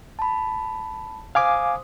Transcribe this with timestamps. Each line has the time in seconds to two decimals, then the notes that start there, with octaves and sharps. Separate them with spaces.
0.19 A5 B5
1.35 C5 F5 G#5 D6 D#6